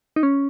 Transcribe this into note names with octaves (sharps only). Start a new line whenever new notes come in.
D#4
C#4